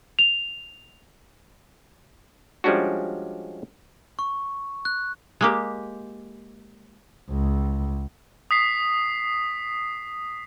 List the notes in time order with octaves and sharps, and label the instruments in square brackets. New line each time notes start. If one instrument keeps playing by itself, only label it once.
[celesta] F7
[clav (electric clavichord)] F3 G3 G#3 C#4 D4 F#4
[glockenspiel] C#6
F#6
[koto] G#3 A#3 G4
[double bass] C#2
[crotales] D#6 B6 C7